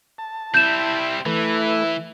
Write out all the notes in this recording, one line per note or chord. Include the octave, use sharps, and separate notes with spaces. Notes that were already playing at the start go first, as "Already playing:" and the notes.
A5
G3 C4 E4 G6 E7
E3 A3 E4 B4